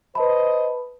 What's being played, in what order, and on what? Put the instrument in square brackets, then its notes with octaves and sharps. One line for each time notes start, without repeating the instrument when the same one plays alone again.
[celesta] B4 A5 B5 [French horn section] C5 D#5